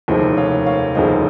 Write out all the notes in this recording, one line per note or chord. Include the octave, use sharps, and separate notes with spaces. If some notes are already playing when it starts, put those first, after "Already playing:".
F1 D#2 C#3 F3 G#3 G#4 C5
C#5 F5
C#5 F5
F1 D#2 C#3 F3 G#3 C5 D#5